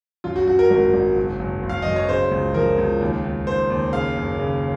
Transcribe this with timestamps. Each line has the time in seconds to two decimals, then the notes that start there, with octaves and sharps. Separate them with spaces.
0.24 F#2 F4
0.36 F#4
0.47 F#2 F#4
0.59 A#4
0.70 G#1 A#4
0.94 G#1
1.16 F#1
1.39 F#1
1.63 F#1
1.69 F5
1.82 F#2 D#5
1.96 C#5
2.09 C#3 C5
2.31 C#2
2.54 F3 A#4
2.78 C#2
3.01 D#2
3.24 D#2
3.46 D#2 C5
3.70 D#2
3.92 C#3 F5
4.16 F#1
4.39 C#3